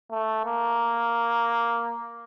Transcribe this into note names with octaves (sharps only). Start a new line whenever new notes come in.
A3
A#3